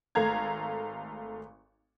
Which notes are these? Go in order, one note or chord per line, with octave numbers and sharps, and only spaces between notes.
G#1 A3 A4 F5 A#5 G#6